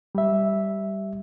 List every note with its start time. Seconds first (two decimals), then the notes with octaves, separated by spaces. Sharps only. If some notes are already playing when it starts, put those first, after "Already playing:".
0.15 G3 E5